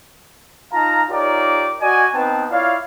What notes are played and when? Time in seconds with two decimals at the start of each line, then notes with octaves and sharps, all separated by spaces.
0.72 D#4 F4 F5 A5 A#5
1.10 D#4 F4 G4 A#4 C#5 D5
1.80 F#4 D5 D#5 G#5
2.15 B3 C4 D#4 B4 G5 A5
2.50 E4 F4 C#5 D5 F5